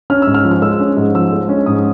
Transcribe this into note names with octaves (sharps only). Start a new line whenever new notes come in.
C#4 F6
G#2 E6
F6
F3
F6
G#3 E6
C#4
G#2
F3 E6
G#3
C#4
G#2 D#6